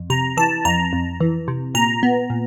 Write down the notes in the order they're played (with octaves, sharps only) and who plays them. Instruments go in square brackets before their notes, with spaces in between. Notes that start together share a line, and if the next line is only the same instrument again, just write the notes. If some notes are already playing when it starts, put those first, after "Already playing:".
Already playing: [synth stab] F2
C3 A#5
E3 A5
F2 A#5
F2
E3
C3
A#2 A#5
B3
A#2